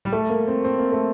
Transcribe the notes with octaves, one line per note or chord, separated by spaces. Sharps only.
G3
A3
A#3
C4
C4
A#3
A3